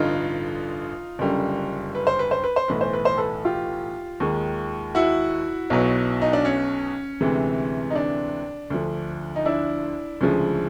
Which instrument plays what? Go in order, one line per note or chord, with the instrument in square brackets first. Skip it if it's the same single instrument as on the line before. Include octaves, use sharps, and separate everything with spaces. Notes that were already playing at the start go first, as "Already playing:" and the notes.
Already playing: [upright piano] A1 G2 D3 D#4 F4
F#1 F#2 D3 G3
B4
C5
B4
C5
B4
C5
B1 A2 E3 A3 B4
C5
B4
C5
A4 B4
F4 G4
D#2 D#3 G#3
E4 F#4
B1 B2 F#3
D#4
D4
C#4
D2 C3 E3 G#3
D#4
D4
D2 D3 F3
D#4
D4 E4
D2 C#3 F3 G#3